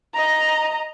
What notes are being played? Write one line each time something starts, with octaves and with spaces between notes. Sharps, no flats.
D#5 A#5